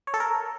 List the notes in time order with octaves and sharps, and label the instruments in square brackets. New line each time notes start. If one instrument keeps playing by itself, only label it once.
[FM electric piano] C#5
A4
A#4